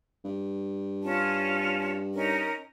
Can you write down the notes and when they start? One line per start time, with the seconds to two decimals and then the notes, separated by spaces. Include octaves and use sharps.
0.25 G2
1.02 C#4 F4 A5
2.14 C#4 D#4 A#4